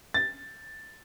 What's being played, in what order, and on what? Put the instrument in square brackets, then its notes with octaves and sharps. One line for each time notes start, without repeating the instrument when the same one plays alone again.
[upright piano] A6